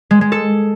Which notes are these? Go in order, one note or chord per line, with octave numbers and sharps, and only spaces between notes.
G#3
G#3
A4